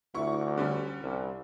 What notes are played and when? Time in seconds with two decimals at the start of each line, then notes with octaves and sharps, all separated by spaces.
0.14 D2 E4 C#6
0.57 D3 G3 C#4
1.01 C2